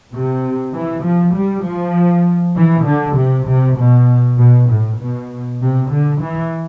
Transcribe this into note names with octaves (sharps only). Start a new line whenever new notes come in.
C3
E3
F3
G3
F3
E3
D3
C3
C3
B2
B2
A2
B2
C3
D3
E3